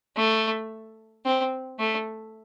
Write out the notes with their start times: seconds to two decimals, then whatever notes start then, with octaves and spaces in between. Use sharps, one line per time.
0.16 A3
1.25 C4
1.79 A3